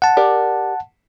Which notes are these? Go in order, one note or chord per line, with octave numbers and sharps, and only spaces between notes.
F#5 A5
G4 A#4 D5